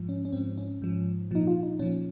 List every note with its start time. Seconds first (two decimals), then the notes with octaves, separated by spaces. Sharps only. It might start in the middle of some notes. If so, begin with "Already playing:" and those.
Already playing: G#2 F3
0.09 C#4
0.25 C#4
0.32 G#2 F3 C4
0.58 C#4
0.82 G#2 F3
1.31 A#2 F3 D#4
1.47 F4
1.63 D#4
1.79 A#2 F3 C#4